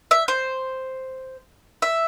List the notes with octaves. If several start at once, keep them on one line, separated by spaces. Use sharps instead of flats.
E5
C5
E5